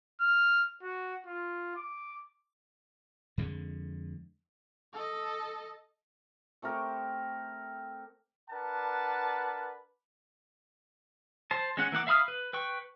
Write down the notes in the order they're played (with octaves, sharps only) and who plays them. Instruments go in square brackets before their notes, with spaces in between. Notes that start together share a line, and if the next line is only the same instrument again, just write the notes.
[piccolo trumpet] F6
F#4
F4
D6
[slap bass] F2 D3 G#3
[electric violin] A4 D#5
[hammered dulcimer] A3 C4 G4 A#4
[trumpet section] D4 A#4 B4 F#5 A5
[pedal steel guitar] C5 A5
G#3 C#4 F#5
E3 A#3 F#5 D6
E5 F5 B5 D#6 F6
B4
B4 G5 C#6